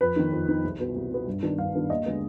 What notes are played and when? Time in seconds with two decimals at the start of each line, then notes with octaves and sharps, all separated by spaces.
0.01 F2 B4
0.16 D#3 B3 D#4
0.32 F2
0.48 D#3 B3 D#4
0.64 C2
0.80 B2 B3
0.96 C2
1.11 B2 B3
1.27 G2
1.42 D#3 B3 D4
1.58 G2 F5
1.74 D#3 B3 D4
1.90 D#2 D#5
2.06 D3 G#3 B3